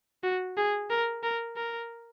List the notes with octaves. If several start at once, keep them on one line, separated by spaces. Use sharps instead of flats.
F#4
G#4
A#4
A#4
A#4